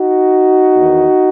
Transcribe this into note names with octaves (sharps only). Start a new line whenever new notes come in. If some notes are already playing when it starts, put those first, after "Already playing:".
Already playing: D#4 F#4
E2 D#3